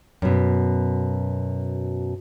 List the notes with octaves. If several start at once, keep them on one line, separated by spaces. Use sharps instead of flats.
F#2 B2